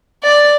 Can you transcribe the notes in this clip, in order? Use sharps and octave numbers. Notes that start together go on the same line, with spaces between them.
D5